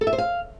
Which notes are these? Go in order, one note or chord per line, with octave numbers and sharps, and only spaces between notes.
A4
E5
C5
F5